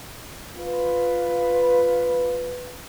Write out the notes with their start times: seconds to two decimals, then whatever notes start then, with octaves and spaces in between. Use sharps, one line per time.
0.56 F4 B4